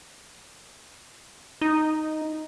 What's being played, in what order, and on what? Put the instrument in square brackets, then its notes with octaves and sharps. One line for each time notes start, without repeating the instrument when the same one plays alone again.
[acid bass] D#4